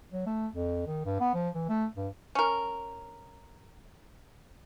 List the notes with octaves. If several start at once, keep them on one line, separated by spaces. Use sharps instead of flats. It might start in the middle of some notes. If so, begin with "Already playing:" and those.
F#3
A3
F2
D#3
G2
B3
F3
E3
A3
G2
C#4 A#4